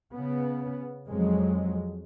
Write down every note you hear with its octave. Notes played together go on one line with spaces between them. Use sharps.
C#3 B3
F2 F#3 G#3